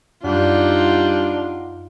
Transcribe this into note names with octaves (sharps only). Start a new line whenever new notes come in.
F#2 G3 D4 D#4 F4 F#5